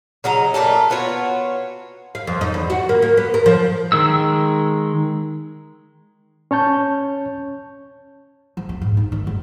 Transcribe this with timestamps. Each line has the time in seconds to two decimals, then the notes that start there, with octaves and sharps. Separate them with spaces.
0.24 C#3 F#3 D#5 A#5
0.54 A#2 C#3 A3 A4
0.90 B3 F4 F#4 C#5
2.15 F5
2.27 F2
2.41 D#4
2.54 E2
2.70 F#4
2.89 A#3
3.02 A#3
3.17 B3
3.34 A#4
3.46 F3
3.92 D#3 G#3 E6
6.51 C#4 C#5 A5 G6
8.57 F3
8.69 C4
8.81 G#2
8.97 D#4
9.12 D#3
9.27 F#1